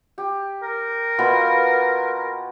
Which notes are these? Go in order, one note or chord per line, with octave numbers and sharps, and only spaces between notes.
G4
A#4
B2 B3 F4